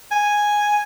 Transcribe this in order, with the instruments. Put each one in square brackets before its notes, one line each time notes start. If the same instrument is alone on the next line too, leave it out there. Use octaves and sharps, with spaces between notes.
[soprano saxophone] G#5